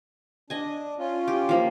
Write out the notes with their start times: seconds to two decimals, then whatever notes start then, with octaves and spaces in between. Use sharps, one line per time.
0.50 D4 D#5 G#5
0.99 C#4 F4
1.28 G4
1.49 F3 A#3